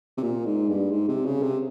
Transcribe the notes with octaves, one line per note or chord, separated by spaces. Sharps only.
C3
A#2
G#2
G2
G#2
C3
C#3
C3